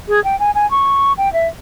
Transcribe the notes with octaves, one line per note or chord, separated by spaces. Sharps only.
G#4
G5
G#5
G#5
C#6
G5
E5